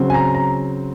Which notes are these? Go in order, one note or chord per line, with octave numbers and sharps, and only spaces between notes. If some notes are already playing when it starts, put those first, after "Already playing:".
Already playing: C#3 F#3 C4
G#5
A#5
A#5